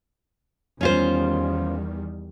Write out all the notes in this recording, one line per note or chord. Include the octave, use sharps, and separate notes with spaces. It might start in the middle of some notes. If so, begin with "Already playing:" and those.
E2 D#3 G3 C#4 F4 C5